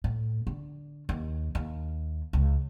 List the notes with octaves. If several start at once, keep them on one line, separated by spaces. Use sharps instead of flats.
A2
D3
D#2
D#2
C#2